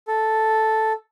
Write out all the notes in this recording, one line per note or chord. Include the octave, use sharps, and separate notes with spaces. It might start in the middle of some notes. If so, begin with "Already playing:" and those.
A4